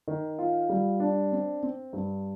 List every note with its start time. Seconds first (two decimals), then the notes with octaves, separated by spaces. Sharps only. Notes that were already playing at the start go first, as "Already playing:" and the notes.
0.08 D#3
0.39 F4
0.69 G3
1.00 D4
1.32 C4
1.63 C4
1.93 G2